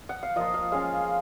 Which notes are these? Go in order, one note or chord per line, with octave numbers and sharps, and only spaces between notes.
F#5
F5
F3 A#3 F4 D#5
F5
G#3 C#4 F4 F5